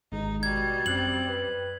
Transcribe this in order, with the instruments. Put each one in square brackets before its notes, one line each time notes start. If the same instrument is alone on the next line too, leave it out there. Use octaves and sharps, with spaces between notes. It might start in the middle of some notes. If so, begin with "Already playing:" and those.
[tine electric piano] G#1 G#3 [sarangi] D#4
[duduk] B2 [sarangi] G3 [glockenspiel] G#6
[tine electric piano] F#2 F#6 C7 [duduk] C4 [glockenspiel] F#7
[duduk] B4